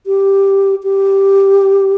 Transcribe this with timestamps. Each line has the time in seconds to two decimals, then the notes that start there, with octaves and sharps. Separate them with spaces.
0.06 G4
0.83 G4